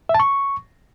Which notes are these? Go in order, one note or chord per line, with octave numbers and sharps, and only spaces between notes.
E5
A5
C#6